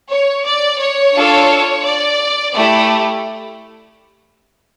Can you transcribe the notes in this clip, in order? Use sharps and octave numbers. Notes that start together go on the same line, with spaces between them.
C#5
D5
C#5
D4 F4 A4
D5
A3 E4 G4 D5